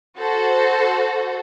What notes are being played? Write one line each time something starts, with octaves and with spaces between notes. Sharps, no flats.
F#4 A4 C5